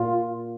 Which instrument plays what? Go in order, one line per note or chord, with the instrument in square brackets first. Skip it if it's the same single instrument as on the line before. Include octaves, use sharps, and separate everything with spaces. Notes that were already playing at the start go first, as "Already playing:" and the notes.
Already playing: [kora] A#2 [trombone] F4